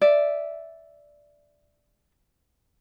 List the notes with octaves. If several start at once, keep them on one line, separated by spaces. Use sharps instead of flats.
D5 E5